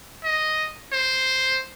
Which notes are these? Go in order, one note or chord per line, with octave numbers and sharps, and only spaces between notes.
D#5
C5